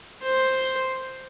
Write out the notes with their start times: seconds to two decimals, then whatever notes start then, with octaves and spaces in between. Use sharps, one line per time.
0.23 C5